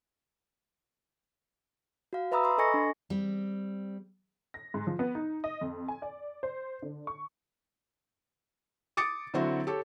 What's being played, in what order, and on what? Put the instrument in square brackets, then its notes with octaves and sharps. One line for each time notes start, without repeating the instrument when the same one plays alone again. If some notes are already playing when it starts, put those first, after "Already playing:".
[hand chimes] F#4 F5
B4 E5 A#5 B5 D#6 E6
B5 C6
A4 D#5 G#5 C#6 A#6 C#7
D4
[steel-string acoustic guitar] G3 C4
[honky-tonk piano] A#6
G#2
F3
B3
D#4
D#5
F2
G#5
D5
C5
D3
C#6
[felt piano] D6 D#6 A6 C#7 D7
D3 F#3 C4 E4 F#4
G4 A4 C#5